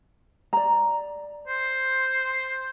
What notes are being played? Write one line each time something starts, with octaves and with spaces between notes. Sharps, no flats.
D5 A#5
C5